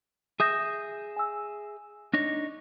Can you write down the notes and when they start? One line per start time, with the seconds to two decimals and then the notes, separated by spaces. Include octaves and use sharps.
0.40 G#4 E5 D#6 G6 A#6
1.16 G#5 E6
2.14 D4 D#4 C#5 A#6